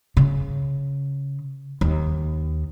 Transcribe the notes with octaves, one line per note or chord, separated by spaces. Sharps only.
C#3
D#2